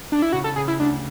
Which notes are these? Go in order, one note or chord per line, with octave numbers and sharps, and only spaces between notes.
D4
E4
C#3 F#4
A4
C#3 G#4
E4
D2 D4